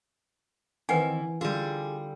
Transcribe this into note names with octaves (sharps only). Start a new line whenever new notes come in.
D#3 E3 C4 B4 F#5 G#5
D3 G3 F4 G#4